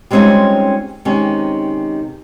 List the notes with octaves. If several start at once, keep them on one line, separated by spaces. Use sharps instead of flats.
G3 G#3 C4 C#4 D#4 F4
C3 D#3 G#3 C#4